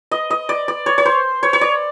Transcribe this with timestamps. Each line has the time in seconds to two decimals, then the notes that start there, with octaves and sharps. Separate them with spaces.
0.11 D#5
0.30 D#5
0.49 D5
0.68 D5
0.86 C#5
0.98 C#5
1.05 C5
1.43 C#5
1.53 C#5
1.61 D5